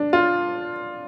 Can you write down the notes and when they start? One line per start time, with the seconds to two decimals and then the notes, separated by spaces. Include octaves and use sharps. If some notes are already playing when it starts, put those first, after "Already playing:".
Already playing: D4
0.13 F4